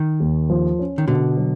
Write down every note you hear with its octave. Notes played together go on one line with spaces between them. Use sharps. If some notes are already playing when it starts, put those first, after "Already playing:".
Already playing: D#3
D#2
F3
C#4
D#3
B2 D3
F#3